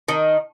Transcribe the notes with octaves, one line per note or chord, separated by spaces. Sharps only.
D#3